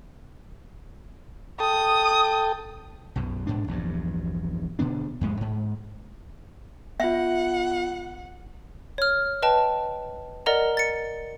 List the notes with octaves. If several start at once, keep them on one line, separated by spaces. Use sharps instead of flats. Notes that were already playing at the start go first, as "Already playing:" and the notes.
A4 G5 A5 D#6
B1 F#2 B2
G#2 D4
A#1 E2 G2
B2 D3 B3 D4
F2 A2 G#3
G#2
B3 F4 E5 F#5
C#5 F6
B4 D#5 G5 A5
A#4 D5 D#5 F#5 A#5
A6 C#7